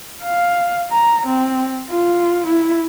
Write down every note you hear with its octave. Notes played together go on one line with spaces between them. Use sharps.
F5
A#5
C4
F4
E4